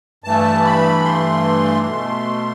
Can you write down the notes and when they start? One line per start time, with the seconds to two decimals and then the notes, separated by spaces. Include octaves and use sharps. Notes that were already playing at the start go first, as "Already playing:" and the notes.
0.24 G2 E3 A3 A5
0.65 B5
1.05 C6
1.86 B2 A3